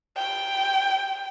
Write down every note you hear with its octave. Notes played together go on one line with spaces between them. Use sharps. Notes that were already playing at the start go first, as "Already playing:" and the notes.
G5